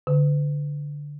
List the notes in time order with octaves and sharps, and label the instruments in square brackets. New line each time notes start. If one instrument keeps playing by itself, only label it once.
[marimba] D3